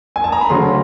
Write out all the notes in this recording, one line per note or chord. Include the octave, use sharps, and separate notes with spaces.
G#5
A5
A#5
B5
D2 C#3 F#3 C6